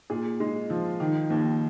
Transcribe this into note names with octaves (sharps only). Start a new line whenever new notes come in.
A#2 G#4
G#3
F3
D#3
D#2